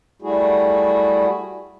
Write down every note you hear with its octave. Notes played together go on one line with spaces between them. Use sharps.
G3 A3 E4 F#4 G#4